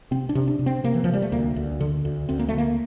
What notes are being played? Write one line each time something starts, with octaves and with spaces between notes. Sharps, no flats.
C3 C4
D4
C3
D4
C3
C4
C3 A#3
E3
C3 F3
G3
A3
D2 A#3
D2
D3
D2
D2 C4
A#3
A3
D3 A#3